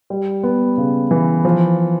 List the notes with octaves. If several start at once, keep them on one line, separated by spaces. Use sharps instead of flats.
G3
B3
C#3
E3
F3